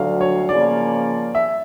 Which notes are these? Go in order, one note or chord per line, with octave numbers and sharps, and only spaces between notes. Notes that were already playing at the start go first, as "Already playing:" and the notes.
Already playing: D2 D3 F#3 F5
C#5
C#3 F3 A#3 D5
E5